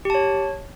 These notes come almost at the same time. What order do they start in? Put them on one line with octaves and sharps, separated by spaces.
G4 A5 C#5